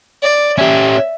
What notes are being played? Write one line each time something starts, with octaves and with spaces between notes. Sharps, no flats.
D5
C#4 G4 E5